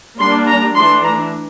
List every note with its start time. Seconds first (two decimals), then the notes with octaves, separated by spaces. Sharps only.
0.19 G3 A#3 D4 C6
0.48 A#5
0.76 E3 A3 D4 C6
1.04 A#5